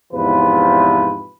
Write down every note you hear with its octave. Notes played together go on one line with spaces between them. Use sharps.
E2 G#2 C3 F3 B4